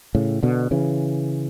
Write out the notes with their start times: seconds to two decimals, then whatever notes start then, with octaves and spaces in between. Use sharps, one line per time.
0.15 A2 C#3
0.43 B2 D3
0.71 C#3 E3